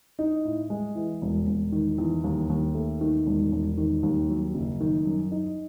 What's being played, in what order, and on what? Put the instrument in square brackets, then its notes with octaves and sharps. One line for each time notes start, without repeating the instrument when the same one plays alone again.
[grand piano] D#4
A2
G#3
E3
E1
E1
D#3
E2
D#2
D#2
A3
D#3
E1
E1
D#3
D#2
F#3
F#1
D#3
F#2
D#4